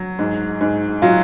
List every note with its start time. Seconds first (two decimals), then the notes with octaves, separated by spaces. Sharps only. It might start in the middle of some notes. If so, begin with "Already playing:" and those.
Already playing: F#3
0.19 G#2
0.61 G#2
1.02 F#3 F4